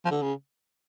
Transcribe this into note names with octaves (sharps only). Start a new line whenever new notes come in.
F3
D3
C#3